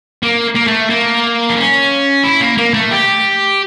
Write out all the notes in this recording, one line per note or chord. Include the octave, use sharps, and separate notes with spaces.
A#3
A#3
A3
A#3
D4
C#4
E4
A#3
A#3
A3
G4